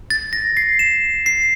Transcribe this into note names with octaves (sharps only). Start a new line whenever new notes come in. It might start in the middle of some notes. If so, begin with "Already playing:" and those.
A6
A#6
C7
E7
C7